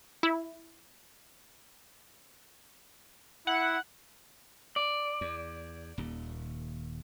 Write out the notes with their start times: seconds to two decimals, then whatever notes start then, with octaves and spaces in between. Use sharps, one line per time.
0.23 E4
3.47 E4 F#5
4.76 D5
5.21 E2
5.98 D#1 D#2